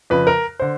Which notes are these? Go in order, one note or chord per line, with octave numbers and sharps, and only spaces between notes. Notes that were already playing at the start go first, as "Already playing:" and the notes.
F2 C#3 F3 B4
A#4
D3 C5